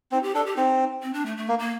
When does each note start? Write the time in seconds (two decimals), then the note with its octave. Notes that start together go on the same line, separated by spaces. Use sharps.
0.12 C4 D#4
0.23 G4
0.34 D4 A4
0.46 G4
0.56 C4 D#4
1.03 C4
1.13 D4
1.26 A3
1.37 A3
1.48 A#3
1.59 A#3